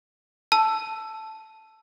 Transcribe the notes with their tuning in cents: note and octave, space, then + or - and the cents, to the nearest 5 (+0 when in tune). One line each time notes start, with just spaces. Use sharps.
A5 -5 E6 +15